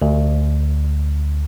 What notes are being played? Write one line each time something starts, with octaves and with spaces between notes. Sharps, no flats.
D2